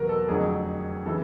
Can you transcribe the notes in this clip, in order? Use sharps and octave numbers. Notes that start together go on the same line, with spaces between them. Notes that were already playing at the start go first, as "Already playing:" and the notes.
Already playing: E2 B2 F#3 A#4 B4
A4
F1 F2 D3 F#3 G#4
C#3 E3 A4